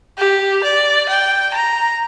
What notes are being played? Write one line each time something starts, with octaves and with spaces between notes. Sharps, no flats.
G4
D5
G5
A#5